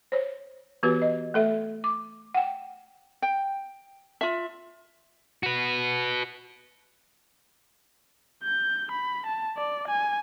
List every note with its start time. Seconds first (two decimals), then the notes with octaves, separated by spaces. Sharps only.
0.12 C5 C#5
0.83 E3 B3 F#4 G4 B4
1.02 D#5
1.34 A3 A4 E5
1.84 D6
2.35 F#5 G5
3.22 G5
4.21 F4 E5
5.43 F#4 B4
8.43 G6
8.91 B5
9.26 A5
9.57 D5
9.87 G#5